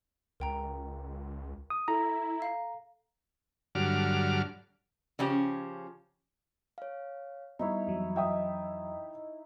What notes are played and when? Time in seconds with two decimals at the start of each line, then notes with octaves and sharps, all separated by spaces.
0.40 C#2 A#4 G5 A#5
1.70 D#6
1.88 E4 A4 A#5
2.42 F5
3.75 G2 D3 F#3 D6 F6
5.19 C#3 F3 C#4 G4
6.78 C#5 F5
7.59 G3 B3 D#4 E4 C#5
7.87 F2 E3 F#3
8.16 D#5 E5 G5 D#6